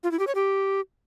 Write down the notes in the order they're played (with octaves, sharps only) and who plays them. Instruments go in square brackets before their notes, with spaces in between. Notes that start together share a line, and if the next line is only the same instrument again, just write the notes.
[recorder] F4
E4
G4
C#5
G4